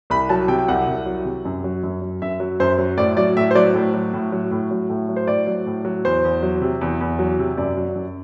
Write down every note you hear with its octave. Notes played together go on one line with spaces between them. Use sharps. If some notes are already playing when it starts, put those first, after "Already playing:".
C2 B5
F#3 A5
C3 G5
G5
C2 F#5
C2
F#3
C3
F#2
F#3
F#2
F#3
F#2 E5
F#3
F#2 C5
F#3
A2 D5
F#3 D5
A2 E5
C5
F#3 D5
A2
F#3
A2
F#3
A2
F#3
A2
F#3
C5
A2 D5
F#3
A2
F#3
E2 C5
E2
F#3
C3
E2
E2
F#3
C3
F#2 D5
F#3
F#2